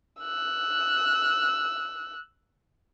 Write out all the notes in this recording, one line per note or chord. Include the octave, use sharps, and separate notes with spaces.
E6 F#6